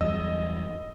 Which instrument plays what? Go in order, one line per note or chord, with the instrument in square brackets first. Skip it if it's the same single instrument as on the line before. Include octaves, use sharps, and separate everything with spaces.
[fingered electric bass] E2 G2 F#3 [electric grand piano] D#5 E6